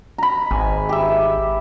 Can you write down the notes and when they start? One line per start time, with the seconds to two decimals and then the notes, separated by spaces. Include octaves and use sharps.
0.18 A#5 B5
0.51 G#1 G#5
0.89 G4 E5